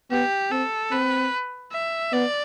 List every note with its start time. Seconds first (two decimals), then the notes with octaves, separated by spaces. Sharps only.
0.11 B3 G4
0.51 C4 A4
0.91 C4 B4
1.72 E5
2.12 B3 D5